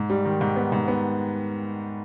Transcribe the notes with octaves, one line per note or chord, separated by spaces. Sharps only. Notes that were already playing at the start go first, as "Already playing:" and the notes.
Already playing: G#2
G3
D#3
G#2
B3
G#2
B3